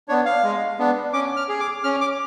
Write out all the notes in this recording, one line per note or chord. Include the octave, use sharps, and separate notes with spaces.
B3 D4 C#5
F5
G#3
B3 D4
C#4 D6
F6
G#4
D6
C#4 F6
D6